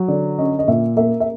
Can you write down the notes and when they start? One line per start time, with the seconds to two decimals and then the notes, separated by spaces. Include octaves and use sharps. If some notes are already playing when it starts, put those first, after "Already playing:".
Already playing: F#3
0.08 D3 D5
0.38 C#4 D#5
0.59 D#5
0.68 A#2 E5
0.96 A#3 E5
1.20 E5